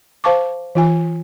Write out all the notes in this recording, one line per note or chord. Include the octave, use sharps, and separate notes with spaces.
C5 F5 A5 C#6 D6
E3 F4 G#5